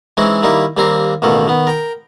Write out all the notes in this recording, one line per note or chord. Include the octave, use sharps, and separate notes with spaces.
E3 G#3 C4 C#4 D#4
D#3 G3 A#3 D#4 E4
D#2 G3 A#3 C4 A#5 C6
A1 B2 D#3 A#3 A4
D#3 B3
A#4 G5